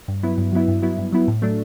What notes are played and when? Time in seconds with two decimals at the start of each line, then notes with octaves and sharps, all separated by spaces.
0.08 G2
0.23 F#3 B3 E4
0.38 G2
0.52 F#3 B3 E4
0.68 G2
0.82 F#3 B3 E4
0.98 G2
1.12 F#3 B3 E4
1.28 A2
1.42 F#3 A3 D4